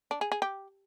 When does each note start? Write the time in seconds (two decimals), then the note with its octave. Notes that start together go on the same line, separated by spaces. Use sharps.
0.11 D4
0.21 G#4
0.32 G#4
0.42 G4